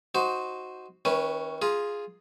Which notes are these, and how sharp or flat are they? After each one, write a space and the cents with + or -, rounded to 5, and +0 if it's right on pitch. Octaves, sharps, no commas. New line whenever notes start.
D#4 +10 F#4 +0 C5 +0
D#3 +35 C#4 -10 B4 +0
F4 +0 G#4 +0 A#5 +35